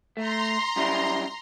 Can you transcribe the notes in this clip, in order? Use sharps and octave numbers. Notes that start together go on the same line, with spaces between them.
A3 A#5 C6
F#2 G3 E4